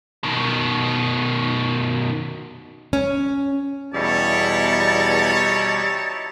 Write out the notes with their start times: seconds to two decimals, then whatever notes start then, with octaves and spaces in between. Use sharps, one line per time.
0.24 B2 D#3
2.93 C#4
3.93 E2 B2 G3 D#4 E4 G4 C#5 A5